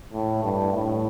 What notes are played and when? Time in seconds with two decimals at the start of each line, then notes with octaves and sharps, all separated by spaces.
0.13 A2
0.44 G2
0.74 A2